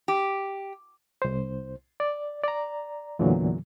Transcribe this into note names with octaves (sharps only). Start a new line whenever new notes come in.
G4
C2 C5
D5
D5 A#5
E2 A#2 D3 E3 F#3